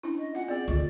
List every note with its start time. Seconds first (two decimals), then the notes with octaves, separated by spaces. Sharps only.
0.03 C#4 D4 E4
0.19 D#5
0.35 B3 F4 D#5 F#5
0.48 C4 G#4 D5
0.68 D2 F4 D#5 C#6